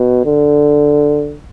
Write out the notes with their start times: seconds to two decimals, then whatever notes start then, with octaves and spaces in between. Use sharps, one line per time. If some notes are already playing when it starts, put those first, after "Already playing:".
Already playing: B2
0.26 D3